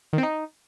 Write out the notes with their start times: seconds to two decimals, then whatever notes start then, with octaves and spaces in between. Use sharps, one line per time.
0.13 D#3
0.18 C4
0.23 D#4